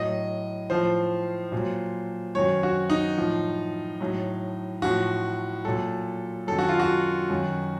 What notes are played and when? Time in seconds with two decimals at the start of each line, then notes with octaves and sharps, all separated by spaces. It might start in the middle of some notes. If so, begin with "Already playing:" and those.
Already playing: A2 F#3 D#5
0.70 A2 F3 C5
1.52 A#2 F#3
2.35 F#2 D#3 F#3 C#5
2.63 F#4
2.90 D#4
3.17 A2 F3
4.00 A2 F#3
4.82 A2 F3 F#4
5.65 A#2 F#3 A4
6.47 F#2 D#3 F#3 A4
6.59 F#4
6.69 F4
6.79 F#4
7.29 F#2 D#3 F#3